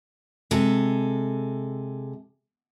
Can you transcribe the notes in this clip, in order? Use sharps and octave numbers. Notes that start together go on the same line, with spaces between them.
C3 G#3 A4